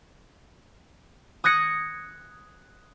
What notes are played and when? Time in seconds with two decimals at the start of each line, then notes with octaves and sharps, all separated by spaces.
1.44 D#6 F#6 G#6 A#6 C#7